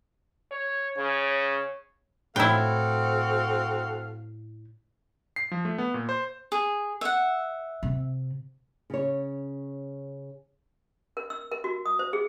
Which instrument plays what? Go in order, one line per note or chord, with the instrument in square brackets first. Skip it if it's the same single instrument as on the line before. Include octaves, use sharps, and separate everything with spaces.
[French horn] C#5
[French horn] C#3 [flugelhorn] C#5
[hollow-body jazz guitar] A2 [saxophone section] C4 F#4 F5 [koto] E4 G5 [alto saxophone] A4
[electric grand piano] C7
F3
A3
B3
A#2
C5
[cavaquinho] G#4
E5 F#5
[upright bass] C3
[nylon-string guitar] C#3 C#5
[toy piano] A#4
E6
A#4
F#4
D#6
C5
G#4